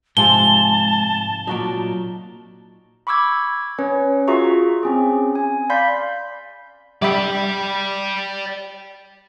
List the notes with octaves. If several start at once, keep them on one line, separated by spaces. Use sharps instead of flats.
G#2 C3 F3 G#3 A5 G7
A#2 F#3 D#4 F#4 D5
B5 C#6 D6 E6 G#6
C#4 B4 C#5
F4 F#4 G#4 E5 A#5 C#6
C4 C#4 G#4
G#5
D5 F5 B5 C6 G6 B6
G3 D5 E5 G5 B5